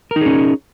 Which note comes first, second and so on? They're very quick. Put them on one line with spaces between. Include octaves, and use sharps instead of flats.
A#4 D#4 G#4 C#4